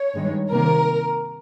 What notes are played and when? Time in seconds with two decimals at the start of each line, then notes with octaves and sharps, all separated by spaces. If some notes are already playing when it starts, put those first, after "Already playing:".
Already playing: C#5
0.15 G2 D#3 G#3
0.51 C3 D#3 A#3 A#4